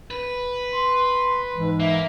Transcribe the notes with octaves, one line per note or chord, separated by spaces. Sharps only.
B4
C6
G#2 E3 G#3
A#3 E5